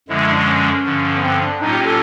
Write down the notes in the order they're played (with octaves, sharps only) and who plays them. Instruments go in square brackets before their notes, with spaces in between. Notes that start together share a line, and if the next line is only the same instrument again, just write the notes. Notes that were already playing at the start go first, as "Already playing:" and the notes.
[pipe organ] F#2 D3 F3 G#3 [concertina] E4
[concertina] D4
C#4
[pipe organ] G2 D3 F3
[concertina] B3
C4
D4
[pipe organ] A2 F#3 A#3 C#4 F4 [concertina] D#4
[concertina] G4
A4